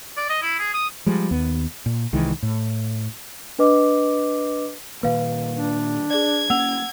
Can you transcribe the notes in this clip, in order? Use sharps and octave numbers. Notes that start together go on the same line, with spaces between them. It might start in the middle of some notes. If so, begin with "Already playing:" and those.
D5
D#5
E4
G#4
D#6
F3 G3 G#3
D#2 B3
A#2
C2 D#3 E3 G#3
A2
D4 B4 D#5 D6
A#2 D#3 A#3 B4 F5
D4
G#4 D5 G#6
A#3 C#4 F#5 E6 F7